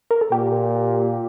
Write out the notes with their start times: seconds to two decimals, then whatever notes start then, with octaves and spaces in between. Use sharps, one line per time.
0.11 A#4
0.21 A4
0.32 A#2 G4